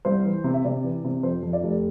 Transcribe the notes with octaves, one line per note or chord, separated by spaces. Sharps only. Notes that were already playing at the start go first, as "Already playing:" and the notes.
C2 C5
E3
C3
E5
C3 D5
E3
C3
F2 C5
F2
D5
F1